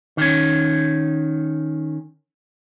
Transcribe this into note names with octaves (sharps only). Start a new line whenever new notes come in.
D#3 C#4